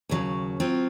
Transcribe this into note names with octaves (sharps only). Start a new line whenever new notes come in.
D#2 C#3 F#3
F#3 C4 F4